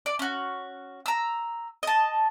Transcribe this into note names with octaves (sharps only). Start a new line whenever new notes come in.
D5
C#4 F#4
A#5 E6
D#5 A5